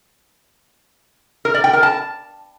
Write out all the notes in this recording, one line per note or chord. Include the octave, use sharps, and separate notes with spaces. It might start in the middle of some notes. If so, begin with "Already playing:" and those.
A#4
D5
G5
A#4
A5